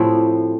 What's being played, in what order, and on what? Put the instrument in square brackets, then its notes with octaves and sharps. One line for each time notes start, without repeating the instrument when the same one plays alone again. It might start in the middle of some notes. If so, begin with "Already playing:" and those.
Already playing: [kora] A2 C3 F3 C4 E4